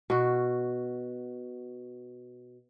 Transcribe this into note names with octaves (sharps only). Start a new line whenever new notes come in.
B2 F#4